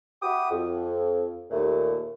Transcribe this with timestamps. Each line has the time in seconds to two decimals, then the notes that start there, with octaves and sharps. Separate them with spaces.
0.22 F#4 E5 G5 B5 D6 D#6
0.50 F2
1.50 D#2 A#2 A3